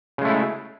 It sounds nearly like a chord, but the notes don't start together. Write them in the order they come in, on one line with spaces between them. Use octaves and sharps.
C#3 G#3 A3 E4